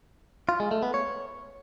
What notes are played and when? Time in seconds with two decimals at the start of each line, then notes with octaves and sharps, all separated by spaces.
0.49 F4
0.60 G#3
0.71 A3
0.83 B3
0.94 C#5